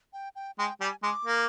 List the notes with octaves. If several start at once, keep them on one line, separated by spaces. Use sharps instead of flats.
G5
G5
G#3 G5
G3 G#5
G#3 D6
A#3